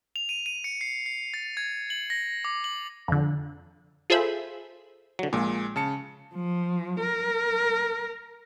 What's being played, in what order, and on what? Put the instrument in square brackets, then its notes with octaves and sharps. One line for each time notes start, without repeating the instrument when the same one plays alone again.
[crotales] F7
D#7
D#7
C#7
C7
C7
A6
G#6
F#7
A#6
D6
F#7
[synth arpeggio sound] F2 D3
F4 G#4 A4 C5 E5 B5
[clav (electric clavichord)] D3 F#3
[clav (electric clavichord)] A#1 [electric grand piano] A#2 G#3
[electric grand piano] C#3 A5 C#7
[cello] F3
A#4